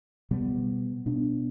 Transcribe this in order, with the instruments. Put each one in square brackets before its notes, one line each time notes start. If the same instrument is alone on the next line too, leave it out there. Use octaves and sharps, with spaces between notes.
[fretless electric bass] B2 G3 B3
B2 B3 D4